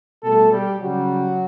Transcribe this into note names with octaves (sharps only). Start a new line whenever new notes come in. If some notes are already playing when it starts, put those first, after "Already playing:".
B2 G3 A3 A4
G3 G4
C#3 F#3 G3 F#4